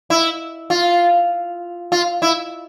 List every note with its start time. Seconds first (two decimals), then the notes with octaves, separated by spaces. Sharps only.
0.10 E4
0.70 F4
1.92 F4
2.22 E4